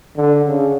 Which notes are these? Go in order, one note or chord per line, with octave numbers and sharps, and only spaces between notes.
D3
C#3